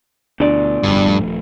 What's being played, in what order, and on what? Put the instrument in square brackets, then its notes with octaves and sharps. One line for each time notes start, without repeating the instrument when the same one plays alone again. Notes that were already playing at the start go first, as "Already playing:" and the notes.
[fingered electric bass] D2 [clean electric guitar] B2 D5 [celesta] D4
[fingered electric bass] F1 D3 [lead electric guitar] G2
[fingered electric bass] D#1 F3 A3